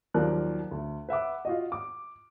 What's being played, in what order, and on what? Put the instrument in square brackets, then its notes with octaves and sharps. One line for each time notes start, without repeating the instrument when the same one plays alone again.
[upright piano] D#2 F3 F#3 A#4 D5 F#6
D2
B4 E5 F#5 D6
F4 F#4 D#5
D6